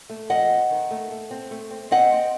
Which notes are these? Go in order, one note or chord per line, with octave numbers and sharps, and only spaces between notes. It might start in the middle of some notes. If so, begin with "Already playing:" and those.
A3
F2 D#5 F#5
C4
D#3
A3
A3
C4
A3
C4
C4 D#5 F#5
C4